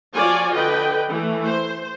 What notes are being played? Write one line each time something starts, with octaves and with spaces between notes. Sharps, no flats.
F3 F4 F#4 C#5 D5 G#5
D3 B4 D#5 G5
E3 A3
C5